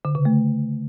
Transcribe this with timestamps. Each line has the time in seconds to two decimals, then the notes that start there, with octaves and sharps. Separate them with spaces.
0.05 D3
0.15 C#3
0.25 A3